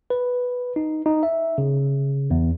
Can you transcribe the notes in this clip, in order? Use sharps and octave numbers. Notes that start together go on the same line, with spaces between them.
B4
D#4
D#4
E5
C#3
E2